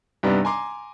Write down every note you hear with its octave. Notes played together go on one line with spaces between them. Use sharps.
G2 C3 B3 D4 D#4
G#5 A#5 C6 D6